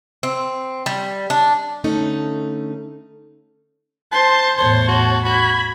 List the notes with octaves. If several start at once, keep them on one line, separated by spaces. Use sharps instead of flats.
C4
G3
D4
D3 A3 C#4 D#4
C5 A5 C6
E2 A2 C5 C#5 A5
F#4
F#4 B5 G#6